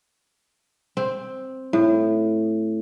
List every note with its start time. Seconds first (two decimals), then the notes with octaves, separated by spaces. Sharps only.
0.97 C4
1.73 A2